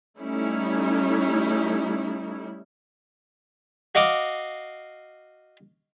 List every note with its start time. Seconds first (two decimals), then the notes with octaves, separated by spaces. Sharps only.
0.19 G3 A3 C#4 D#4 E4
3.95 F#4 D#5 F5 D6